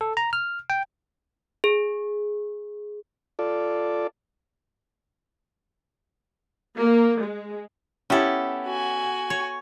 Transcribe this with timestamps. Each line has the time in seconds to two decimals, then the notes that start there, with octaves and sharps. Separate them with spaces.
0.01 A4
0.17 A#5
0.33 F6
0.70 G5
1.64 G#4
3.39 F4 A4 D5
6.78 A#3
7.23 G#3
8.10 B3 C#4 E4 G4 A4
8.65 F#4 G#5
9.30 C#5